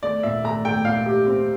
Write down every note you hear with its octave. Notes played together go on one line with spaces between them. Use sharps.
A3 D5
A#2 E5
A3 A#5
A3 G5
A#2 F5
G4
C4